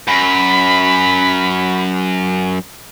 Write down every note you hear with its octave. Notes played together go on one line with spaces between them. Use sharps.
F#2 B5